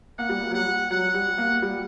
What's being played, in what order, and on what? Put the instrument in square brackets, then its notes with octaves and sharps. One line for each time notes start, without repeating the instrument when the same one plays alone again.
[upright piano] A#3 [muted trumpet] F#5
[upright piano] G3
A#3
F#3
[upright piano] G3 [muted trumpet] F#5
[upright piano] F#3 [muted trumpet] F#5
[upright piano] G3
A#3
G3